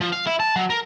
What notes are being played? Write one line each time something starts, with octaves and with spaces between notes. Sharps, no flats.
F3
F5
E4
A5
F#3
A#4